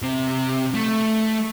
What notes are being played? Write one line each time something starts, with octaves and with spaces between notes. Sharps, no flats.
C3
A3